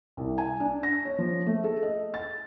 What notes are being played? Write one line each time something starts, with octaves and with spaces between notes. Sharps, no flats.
C2
G#5
D4
A#6
C#5
F3
A3
A4
D#5
A6